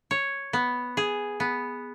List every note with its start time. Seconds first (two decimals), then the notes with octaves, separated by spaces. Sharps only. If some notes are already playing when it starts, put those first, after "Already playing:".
0.11 C#5
0.53 B3
0.97 G#4
1.40 B3